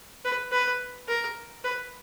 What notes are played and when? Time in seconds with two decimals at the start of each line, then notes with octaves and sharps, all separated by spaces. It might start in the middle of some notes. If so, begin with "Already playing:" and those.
0.24 B4
0.52 B4
1.08 A#4
1.64 B4